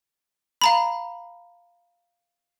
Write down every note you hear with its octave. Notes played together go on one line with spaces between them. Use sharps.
F5 A#5 B5